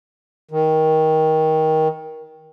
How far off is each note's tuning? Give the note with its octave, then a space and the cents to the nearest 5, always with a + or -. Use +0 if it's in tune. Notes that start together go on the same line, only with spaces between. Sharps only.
D#3 +20